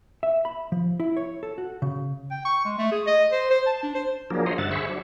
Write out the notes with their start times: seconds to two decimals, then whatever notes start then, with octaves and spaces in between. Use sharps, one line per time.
0.23 E5
0.45 B5
0.72 F3
1.00 E4
1.17 C#5
1.43 A4
1.58 F#4
1.82 C#3
2.31 G5
2.45 C#6
2.65 G#3
2.78 A3
2.91 G#4
3.06 D#5
3.32 C5
3.50 C5
3.67 A5
3.83 D4
3.95 C5
4.30 F3 F#3 A#3 D4 G#4 A#4
4.46 C5 C#5 D#5 A#5 C6
4.58 G2 D3 E5 F#5 A6
4.71 G#4 C5 E5 B5 C#6
4.89 F#3 D4